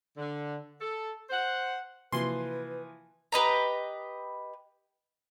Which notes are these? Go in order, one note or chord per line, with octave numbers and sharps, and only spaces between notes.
D3
A4
C5 F#5
C3 E3 F3 A#3 F#4 B4 C6
G4 B4 D#5 A#5